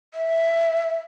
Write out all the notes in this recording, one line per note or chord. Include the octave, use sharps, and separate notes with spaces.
E5